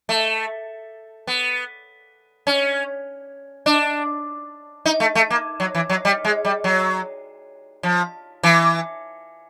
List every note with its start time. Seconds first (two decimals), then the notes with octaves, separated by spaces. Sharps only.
0.09 A3
1.27 B3
2.47 C#4
3.66 D4
4.85 D#4
5.00 A3
5.15 A3
5.30 A#3
5.60 F#3
5.75 E3
5.89 F#3
6.05 G3
6.25 G#3
6.45 G3
6.64 F#3
7.83 F3
8.43 E3